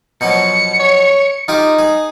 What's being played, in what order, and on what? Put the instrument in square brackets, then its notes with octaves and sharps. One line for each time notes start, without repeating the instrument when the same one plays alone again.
[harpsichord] B2 F3 F#3 [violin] C#7
[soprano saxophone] C#5
[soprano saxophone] D#4 [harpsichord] F4 G4 D6
[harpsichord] G#4